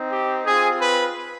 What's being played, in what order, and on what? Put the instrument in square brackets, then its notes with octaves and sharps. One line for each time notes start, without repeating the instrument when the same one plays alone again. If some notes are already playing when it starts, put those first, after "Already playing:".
Already playing: [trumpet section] C4 D#4
G4
C4 F4 G#4
B4